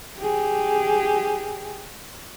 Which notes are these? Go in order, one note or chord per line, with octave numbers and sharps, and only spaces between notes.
G4 G#4